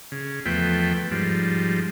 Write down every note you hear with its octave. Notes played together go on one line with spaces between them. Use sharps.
C#3
E2 F3 A3 B4 G5
G#2 F3 G3